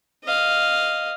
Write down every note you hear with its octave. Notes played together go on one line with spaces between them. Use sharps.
D#5 F5